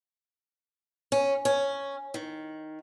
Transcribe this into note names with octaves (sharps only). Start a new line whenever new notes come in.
C#4
C#4
D#3